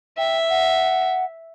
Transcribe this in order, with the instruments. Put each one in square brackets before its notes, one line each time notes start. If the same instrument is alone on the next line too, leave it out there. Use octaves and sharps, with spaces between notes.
[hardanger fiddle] E5 [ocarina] G5
[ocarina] F#5